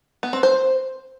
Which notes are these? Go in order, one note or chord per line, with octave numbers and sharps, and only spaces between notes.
B3
C4
C5